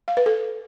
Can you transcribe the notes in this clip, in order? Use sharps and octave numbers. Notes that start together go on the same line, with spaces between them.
F5
B4
A4